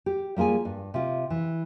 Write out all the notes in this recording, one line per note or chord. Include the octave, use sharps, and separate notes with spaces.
G4
G3 A#3 F4 G#4 G#5
G2
C3 F4
E3